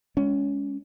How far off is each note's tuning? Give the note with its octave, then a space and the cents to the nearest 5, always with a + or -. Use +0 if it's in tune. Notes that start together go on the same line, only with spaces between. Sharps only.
G#3 +0 C#4 +20